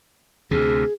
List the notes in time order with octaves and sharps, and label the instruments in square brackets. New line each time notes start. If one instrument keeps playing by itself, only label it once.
[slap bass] D2 C3 [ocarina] G#4